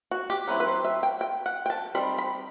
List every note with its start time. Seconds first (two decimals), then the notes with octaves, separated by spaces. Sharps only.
0.11 F#4
0.30 G4
0.48 F#3 C4 E4 B4
0.60 B4
0.67 C5
0.84 E5
1.03 G5
1.21 G5
1.46 F#5
1.66 G5
1.70 A5
1.95 G3 C4 D#4 B5
2.18 B5